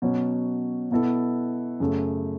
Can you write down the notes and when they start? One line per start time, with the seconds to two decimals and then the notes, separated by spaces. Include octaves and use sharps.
0.02 B2 F#3 C#4
0.91 B2 B3 E4 A4
1.80 F#2 C#3 A3